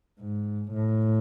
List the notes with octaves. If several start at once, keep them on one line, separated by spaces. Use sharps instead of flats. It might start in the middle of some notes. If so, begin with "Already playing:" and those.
G#2
A2